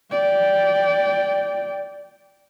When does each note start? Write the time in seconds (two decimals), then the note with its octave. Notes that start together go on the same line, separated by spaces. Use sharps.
0.11 D5 G5